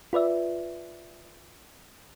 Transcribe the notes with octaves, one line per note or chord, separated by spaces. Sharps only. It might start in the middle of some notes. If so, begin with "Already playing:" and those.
F4 B4 D5 E5